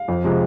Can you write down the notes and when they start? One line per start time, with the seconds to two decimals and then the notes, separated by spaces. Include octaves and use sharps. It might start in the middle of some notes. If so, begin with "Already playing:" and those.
Already playing: F5
0.08 F2
0.24 C3 F3 G#3